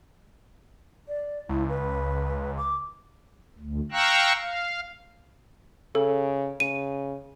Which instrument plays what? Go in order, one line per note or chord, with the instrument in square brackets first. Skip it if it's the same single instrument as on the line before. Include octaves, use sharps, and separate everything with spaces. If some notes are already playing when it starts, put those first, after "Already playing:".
[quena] D5
[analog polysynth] C#2 [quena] E4
[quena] B4
D6
[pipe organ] D2
F5 G5 A#5 C#6 E6 F#6
F5
[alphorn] C#3 [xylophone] A4
[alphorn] C#3 [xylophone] D#7